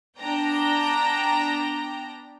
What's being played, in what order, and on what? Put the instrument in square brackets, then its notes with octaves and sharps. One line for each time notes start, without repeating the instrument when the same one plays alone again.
[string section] B3 D4 G5 A#5